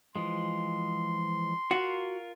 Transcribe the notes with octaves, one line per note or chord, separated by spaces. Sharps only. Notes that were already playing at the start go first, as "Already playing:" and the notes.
E3 F3 G#3 C6
F4 F#4 A#4